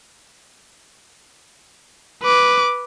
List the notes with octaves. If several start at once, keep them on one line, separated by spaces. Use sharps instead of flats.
B4 D6